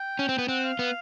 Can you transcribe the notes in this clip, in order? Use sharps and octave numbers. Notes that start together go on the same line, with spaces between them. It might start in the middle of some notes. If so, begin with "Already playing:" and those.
Already playing: G5
C#4
C4
B3
C4 F#5
F5
B3